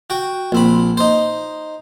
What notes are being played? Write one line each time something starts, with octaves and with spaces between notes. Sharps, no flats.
F#4 G5
A#1 C4 B5
D#4 C5